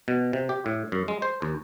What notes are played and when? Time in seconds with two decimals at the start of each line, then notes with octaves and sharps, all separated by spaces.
0.08 B2
0.33 C3
0.49 G4
0.66 A2
0.92 F#2
1.08 G#3
1.22 C5
1.42 D#2